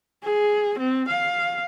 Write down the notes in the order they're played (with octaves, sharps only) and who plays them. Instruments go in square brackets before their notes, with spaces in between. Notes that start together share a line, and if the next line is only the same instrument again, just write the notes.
[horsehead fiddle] G#4
C4
F5